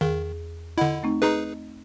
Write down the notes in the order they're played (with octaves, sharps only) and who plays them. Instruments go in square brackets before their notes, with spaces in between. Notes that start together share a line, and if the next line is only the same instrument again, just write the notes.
[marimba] E2 G#4 [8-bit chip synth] D#3
[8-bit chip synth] D3 E4 [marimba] D#5 F#5 B5
[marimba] A3 C4 D#4
[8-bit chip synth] D#4 G#4 B4 [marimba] D#5 A#5